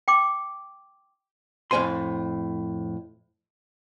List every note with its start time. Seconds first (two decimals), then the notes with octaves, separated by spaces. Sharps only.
0.08 G5 C6 D6
1.71 F2 A2 A3 C5 G#5 C6